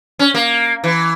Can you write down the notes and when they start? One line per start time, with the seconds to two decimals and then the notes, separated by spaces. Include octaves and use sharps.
0.19 C#4
0.34 A#3
0.84 E3